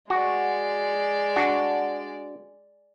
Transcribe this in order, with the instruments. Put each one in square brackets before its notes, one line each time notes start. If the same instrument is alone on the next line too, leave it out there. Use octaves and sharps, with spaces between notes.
[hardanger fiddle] G#3 D5 [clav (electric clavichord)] F#4
[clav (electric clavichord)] D4 F#4